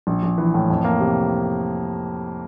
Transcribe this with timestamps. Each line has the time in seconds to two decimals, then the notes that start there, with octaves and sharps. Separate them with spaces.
0.07 A#1
0.23 A#1
0.38 E3
0.54 A2
0.70 F2
0.84 A#3
1.00 C3